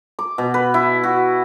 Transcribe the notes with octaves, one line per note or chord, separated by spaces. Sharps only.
D6
B2
B4
E4
F#4